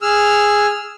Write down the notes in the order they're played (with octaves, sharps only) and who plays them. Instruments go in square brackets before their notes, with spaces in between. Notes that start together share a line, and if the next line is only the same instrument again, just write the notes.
[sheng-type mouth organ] G#4 E6 F6